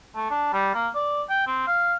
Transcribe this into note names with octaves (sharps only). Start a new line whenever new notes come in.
A3
D4
G3
A#3
D5
G5
C4
F5